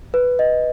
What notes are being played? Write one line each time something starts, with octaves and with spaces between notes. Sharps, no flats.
B4
D#5